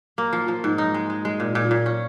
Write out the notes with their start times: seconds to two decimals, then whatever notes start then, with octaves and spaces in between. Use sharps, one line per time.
0.18 A#3
0.33 F3
0.48 F3
0.64 G#2
0.78 D#4
0.94 G#3
1.10 G#3
1.25 G#3
1.40 A#2
1.55 A#2
1.71 A#2
1.86 C#4